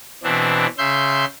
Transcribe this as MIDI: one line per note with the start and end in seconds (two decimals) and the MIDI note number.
0.23 0.67 47
0.23 0.67 52
0.23 0.67 60
0.23 0.67 62
0.78 1.25 49
0.78 1.25 76
0.78 1.25 84
0.78 1.25 91